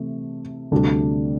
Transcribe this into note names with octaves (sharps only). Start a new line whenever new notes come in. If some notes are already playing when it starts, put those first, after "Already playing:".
Already playing: C3 E3 A3
D2 C3 G3 D4 A4